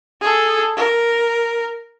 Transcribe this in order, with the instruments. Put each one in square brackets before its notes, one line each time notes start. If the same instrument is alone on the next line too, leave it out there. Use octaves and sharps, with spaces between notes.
[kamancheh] G#4 A4
A#4